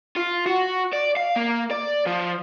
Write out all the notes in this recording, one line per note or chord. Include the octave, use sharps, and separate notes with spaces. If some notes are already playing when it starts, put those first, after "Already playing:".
F4
F#4
D5
F5
A#3
D5
F3